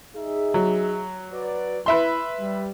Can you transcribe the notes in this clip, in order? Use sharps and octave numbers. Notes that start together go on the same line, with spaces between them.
D#4 G#4 E5
F#3
F#4 B4 D5
E4 B4 E5 C6
G3